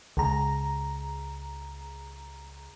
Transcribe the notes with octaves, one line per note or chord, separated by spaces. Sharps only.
C#2 A#5